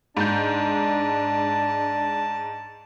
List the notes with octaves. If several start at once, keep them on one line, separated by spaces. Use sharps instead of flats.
G#2 D4 A5 G6